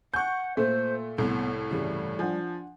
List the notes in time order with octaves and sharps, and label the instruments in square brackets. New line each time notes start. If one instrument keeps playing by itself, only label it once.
[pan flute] F#5 [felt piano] G#5 F#6 [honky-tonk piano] C#6 G6
[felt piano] A#2 [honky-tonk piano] A3 [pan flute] C5
[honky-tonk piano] C2 A2 [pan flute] B3
[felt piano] G2 C#3 E3 [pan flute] G3
[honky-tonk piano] F3 [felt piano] D4 F#5 G#5